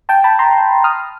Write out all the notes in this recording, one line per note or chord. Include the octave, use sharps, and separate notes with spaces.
G5 A5
A5 B5
A#5 C6
D#6 F6